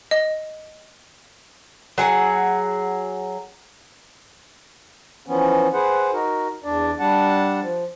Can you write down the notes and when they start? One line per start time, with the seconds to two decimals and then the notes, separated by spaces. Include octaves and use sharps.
0.11 D#5
1.98 F#3 G#4 F#5
5.26 E3 F3 B3 C#4
5.74 G#4 B4 C5 F#5
6.13 D#4 F#4 A#4
6.64 E2 D4 D5
7.00 G3 D4 F#5 A5
7.61 F3